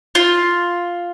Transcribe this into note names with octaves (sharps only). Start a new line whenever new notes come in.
F4